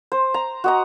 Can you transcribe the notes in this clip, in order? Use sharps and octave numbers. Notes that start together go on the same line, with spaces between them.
C5
A#5
F#4 D#5 A#5